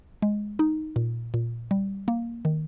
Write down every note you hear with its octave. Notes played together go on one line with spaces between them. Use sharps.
G#3
D#4
A#2
A#2
G3
A#3
D#3